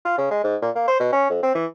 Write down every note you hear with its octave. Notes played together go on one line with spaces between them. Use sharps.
F4
C#3
G#3
G#2
A#2
A#3
C5
B2
C#4
F2
C4
E3